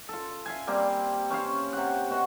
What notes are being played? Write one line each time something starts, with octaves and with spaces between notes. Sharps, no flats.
F4 A4
E5 F5 G#5
G3 A#3 C4
C#4 C5 C#5 F5
C3 F#5
B2 F#4